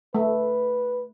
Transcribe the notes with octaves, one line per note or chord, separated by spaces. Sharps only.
A3 B4